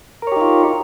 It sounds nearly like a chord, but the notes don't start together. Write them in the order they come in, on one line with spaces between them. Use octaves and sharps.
A#4 C#5 G4 D#4 F4